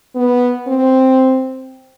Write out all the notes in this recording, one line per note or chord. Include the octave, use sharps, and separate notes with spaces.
B3
C4